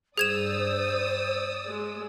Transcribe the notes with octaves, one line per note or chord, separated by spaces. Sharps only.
G2 G#4 C5 D5 D#6 E6 G#6 E7
G#3